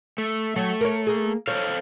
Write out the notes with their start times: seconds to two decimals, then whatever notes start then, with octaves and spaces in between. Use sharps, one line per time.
0.18 A3
0.56 F#3 A3
0.81 A#4 C#5
1.07 A#3 G#4
1.48 A4 C5 C#5 F5